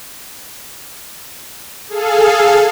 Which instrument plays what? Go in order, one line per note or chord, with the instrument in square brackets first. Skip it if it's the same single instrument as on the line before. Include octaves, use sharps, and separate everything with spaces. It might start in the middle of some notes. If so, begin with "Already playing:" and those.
[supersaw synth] G#4 A4 F5